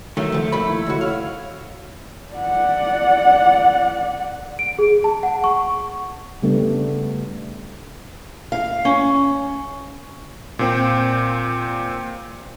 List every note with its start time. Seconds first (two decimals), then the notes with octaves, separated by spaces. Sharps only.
0.17 D#3 F#3 A3 E5
0.32 C#2 F3
0.52 A#2 D#3 B5
0.67 E4
0.87 C#2 F#4
1.01 C#5 F5
2.34 D5 F#5
4.59 D7
4.79 G#4
5.04 A5
5.23 F#5
5.44 C#6
6.42 C#3 G3 A3 B3 D4
8.52 F5
8.85 C#4
10.59 A#2 C4 G5